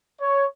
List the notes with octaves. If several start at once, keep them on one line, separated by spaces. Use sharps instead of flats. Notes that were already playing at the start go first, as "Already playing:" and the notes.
C#5